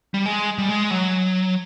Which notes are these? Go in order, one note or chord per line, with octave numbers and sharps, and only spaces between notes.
G3
G#3
G3
G#3
F#3